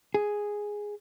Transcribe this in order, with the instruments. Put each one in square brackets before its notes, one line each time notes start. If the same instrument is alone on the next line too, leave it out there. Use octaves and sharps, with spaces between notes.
[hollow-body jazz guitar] G#4